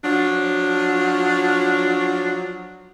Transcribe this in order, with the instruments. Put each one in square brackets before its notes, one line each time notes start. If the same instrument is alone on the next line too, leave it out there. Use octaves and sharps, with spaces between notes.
[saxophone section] F3 F#3 D4